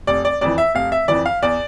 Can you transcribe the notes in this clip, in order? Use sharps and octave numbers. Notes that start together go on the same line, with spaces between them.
F1 D5
D5
F2 E3 D5
E5
F1 F5
E5
F2 E3 D5
F5
E2 D5